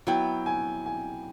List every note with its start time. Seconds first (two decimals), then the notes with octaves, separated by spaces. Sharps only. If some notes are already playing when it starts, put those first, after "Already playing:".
0.07 F#3 B3 E4 G5
0.46 G#5
0.86 G#5